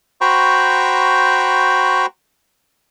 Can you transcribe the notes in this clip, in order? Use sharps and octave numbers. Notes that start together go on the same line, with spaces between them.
F#4 C5 G5 A#5 B5 C#6